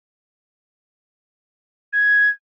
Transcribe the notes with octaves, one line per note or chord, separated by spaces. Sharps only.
G#6